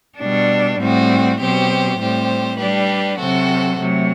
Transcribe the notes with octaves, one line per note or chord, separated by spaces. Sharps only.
B2 G3 D4
A2 G3 C4 F#4
B2 F#3 C4 G4 C5
A2 G3 C4 G4 C5
G3 D4 G4 B4
C3 F#3 C4 F#4 A4
C3 F#3 A3